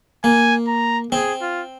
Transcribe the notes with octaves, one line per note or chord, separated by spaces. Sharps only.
A#3 G#5
A#5
C4 G#4
F4